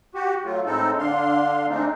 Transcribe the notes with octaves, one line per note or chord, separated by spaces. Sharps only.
F#4 G4
F#3 A3 F4
A2 G#3 C4 D#4 A4
D3 D4 F5 C6
G#3 A3 C4 D4 D#4